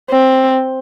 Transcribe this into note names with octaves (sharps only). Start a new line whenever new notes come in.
C4